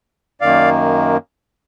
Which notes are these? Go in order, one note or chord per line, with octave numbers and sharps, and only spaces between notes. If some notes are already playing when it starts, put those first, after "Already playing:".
F#2 D#3 A#3 D5 F5